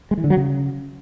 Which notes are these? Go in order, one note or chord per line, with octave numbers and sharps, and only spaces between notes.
G#3
E3
D3
F#3
C#3